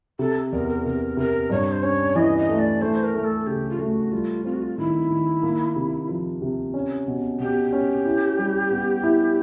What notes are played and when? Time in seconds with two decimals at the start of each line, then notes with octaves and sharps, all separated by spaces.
0.19 C3 A4
0.52 E2 A#4
0.68 A#4
0.85 C3 A#4
1.17 C3 A#4
1.50 G2 C#5
1.72 C5
1.83 C#4 C#5
2.15 E3 D#5
2.38 D#5
2.49 A3
2.59 D5
2.81 A3 C5
3.04 A#4
3.14 A3
3.24 A4
3.47 C#3 G4
3.70 F4
3.79 A3 F#4
4.12 G3 F4
4.44 C4 F4
4.54 F#4
4.62 F4
4.78 D#3 E4
5.10 D#3
5.43 A#3
5.76 C3
6.09 F3
6.42 C3
6.74 C#4
7.08 B2
7.40 B2 G4
7.73 C#4
8.05 E4
8.39 G3
8.71 B3
9.03 E4